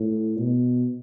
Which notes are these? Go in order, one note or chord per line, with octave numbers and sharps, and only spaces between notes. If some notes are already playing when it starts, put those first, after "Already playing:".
Already playing: A2
B2